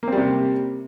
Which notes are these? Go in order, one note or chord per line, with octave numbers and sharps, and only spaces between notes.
C3 G3 A#3 C4